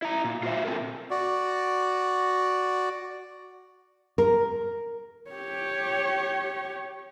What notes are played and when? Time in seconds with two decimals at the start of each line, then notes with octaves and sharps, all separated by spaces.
0.02 E4 A#5
0.24 A#2
0.43 F4 F#4 C5 E5
0.65 A#2 C4 F4 A4 A#4
1.10 F#4 D5
4.18 A#4
5.31 G4 C#5